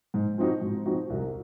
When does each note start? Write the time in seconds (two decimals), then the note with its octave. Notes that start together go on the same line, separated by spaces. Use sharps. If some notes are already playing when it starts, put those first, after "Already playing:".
0.14 G#2
0.38 F3 C4 D#4 F#4
0.61 G#2
0.86 F3 C4 D#4 F#4
1.10 C2